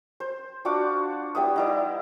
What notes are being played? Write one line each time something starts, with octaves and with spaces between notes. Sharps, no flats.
C5
D4 F4 F#4 D6
G3 B3 E4 D#6
D#4 E4 D5